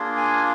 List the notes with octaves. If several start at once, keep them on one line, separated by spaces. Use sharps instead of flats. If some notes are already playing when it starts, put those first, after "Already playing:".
Already playing: A#3 D4 F4 G#4
G#5